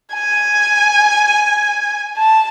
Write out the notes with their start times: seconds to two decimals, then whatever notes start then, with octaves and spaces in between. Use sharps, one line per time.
0.15 G#5
2.18 A5